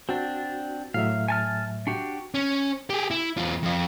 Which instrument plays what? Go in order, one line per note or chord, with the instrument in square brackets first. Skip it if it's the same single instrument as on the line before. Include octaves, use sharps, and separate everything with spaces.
[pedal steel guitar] C4 D4 [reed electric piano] F#4
[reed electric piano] A2 F#3 E5 [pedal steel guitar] F5
[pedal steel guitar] G#5 A5 F6
D4 F#4 G4
[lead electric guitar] C#4
G4 G#4
E4
E2 F4
F2 F4